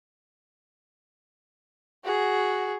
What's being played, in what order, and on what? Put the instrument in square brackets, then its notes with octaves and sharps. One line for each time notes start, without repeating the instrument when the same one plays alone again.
[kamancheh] F#4 G#4